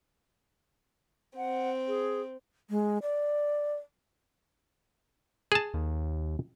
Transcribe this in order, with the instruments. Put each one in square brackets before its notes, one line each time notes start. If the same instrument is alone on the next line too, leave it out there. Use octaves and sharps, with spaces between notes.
[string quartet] C4 [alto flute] F#5
[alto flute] G#4
[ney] G#3
D5
[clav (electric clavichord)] G#4 A5
[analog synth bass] D#2